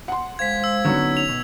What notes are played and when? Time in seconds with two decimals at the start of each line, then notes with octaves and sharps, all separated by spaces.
0.08 F#5 C6
0.39 G#3 C5 F5 G#6 B6
0.64 E6
0.84 D3 F#3 B3 C#4 D#4 C#5
1.17 F7
1.28 B2